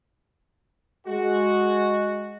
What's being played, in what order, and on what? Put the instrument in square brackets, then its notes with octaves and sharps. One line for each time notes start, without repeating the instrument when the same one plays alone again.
[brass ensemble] G#3 F#4